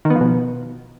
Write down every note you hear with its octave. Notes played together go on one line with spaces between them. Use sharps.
D#3
B3
F3
B2